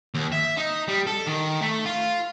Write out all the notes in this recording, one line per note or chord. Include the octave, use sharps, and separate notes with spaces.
D#2
E5
D#4
G3
A4
D#3
A3
F4